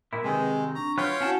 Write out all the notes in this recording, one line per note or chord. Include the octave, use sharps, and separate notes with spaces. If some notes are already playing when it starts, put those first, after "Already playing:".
A#2 E4 A#4
C3 D#3 G#3 G#4 B4 G#5
C4
D4 A#5 C#6
F#3 F4 B4 C#5 F5 G5
C#4 E4 F#4 F#5 A5